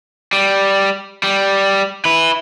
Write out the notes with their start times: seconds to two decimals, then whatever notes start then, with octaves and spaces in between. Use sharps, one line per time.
0.33 G3
1.23 G3
2.05 E4 B4